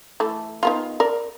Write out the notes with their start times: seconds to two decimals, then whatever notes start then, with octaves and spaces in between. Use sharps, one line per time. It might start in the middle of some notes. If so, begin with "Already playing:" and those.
0.20 E3 A3
0.63 D#3 B3 F4
1.00 A#4 D5